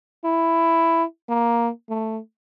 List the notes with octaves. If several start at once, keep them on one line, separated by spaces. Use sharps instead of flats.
E4
A#3
A3